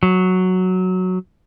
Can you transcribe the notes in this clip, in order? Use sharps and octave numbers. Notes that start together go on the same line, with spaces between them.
F#3